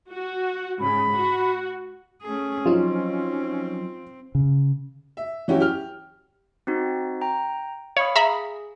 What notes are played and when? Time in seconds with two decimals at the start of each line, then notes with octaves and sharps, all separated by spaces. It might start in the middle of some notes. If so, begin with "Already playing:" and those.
0.10 F#4
0.80 G#2 C#3 B5
1.13 F#4
2.22 A3 C#4 G#4
2.66 F3 F#3 C4 D#4 F4
4.35 C#3
5.17 E5
5.48 E3 F#3 C#4 E4 F#4 G4
5.60 G4 F6
6.67 C4 D#4 F#4
7.21 G5 A#5
7.97 C#5 F5 B5 D#6
8.16 G#4 E5 A#5 B5